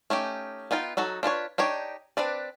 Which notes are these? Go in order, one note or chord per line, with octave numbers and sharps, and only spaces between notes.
A3 C#4 D#4 G4
B3 D#4 F4 G5
F#3 D#4 F#4 A4
D4 F4 B4 C#5
D4 D#4 G4 C#5
C4 D4 B4 D5